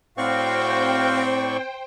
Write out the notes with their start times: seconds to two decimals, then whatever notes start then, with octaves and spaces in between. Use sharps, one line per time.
0.18 A2 C4 F#4 C5 D5 F5 G5 C#6